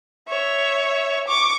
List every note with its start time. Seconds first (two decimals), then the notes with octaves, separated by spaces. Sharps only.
0.29 C#5 E5
1.28 C#6 D6